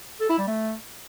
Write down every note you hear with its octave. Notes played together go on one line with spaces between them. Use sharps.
A4
E4
G3
A3